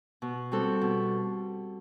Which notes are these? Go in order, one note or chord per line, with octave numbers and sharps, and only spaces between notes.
B2
G3 C4 F#4 A4
B2